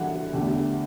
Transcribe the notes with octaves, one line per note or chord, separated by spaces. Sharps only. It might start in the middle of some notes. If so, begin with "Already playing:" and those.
Already playing: E3 G3 D4 F#4 F#5
E2 D3 A3 D4 G4